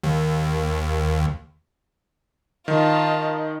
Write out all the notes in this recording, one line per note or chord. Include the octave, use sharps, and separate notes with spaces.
D#2
D#3 F4 D#5 A5